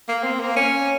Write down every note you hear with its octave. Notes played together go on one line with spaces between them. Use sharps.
A#3
C4
A#3
C#4